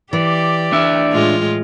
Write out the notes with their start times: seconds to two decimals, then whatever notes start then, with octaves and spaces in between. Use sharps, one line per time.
0.13 E3 G4 D5
0.72 D4 E5
1.12 A2 G#3 F4